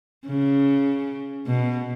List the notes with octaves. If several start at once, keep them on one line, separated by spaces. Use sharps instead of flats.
C#3
B2